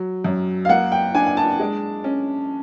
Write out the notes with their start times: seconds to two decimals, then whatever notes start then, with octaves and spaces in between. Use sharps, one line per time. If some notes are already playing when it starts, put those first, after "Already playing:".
Already playing: F#3
0.24 F#2
0.65 F5
0.69 A#3 F#5
0.92 G5
1.15 D4 G#5
1.26 G#5
1.37 A5
1.60 G#3
2.04 C#4